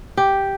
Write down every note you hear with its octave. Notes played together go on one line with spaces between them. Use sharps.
G4